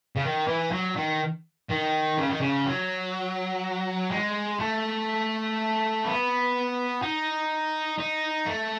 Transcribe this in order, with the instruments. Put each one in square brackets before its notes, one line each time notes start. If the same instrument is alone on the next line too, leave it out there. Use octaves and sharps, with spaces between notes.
[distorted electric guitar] C#3
D#3
E3
F#3
D#3
D#3
C#3
D#3
C#3
F#3
G#3
A3
B3
D#4
D#4
A3